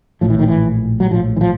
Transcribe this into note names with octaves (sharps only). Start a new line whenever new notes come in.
A#1 A2 F3
E3
D#3
E3
F#3
A#1 A2 F3
E3
F3